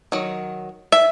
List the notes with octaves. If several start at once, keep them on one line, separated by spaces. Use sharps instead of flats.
D#3 F#3
E5